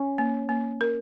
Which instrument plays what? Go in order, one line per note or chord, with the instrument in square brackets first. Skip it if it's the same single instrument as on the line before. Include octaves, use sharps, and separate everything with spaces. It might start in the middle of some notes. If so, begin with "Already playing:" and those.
Already playing: [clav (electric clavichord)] C#4
[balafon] A#3
A#3
A#4